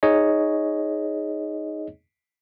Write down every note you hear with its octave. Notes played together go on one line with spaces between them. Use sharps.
D#4 G#4 C#5 D#5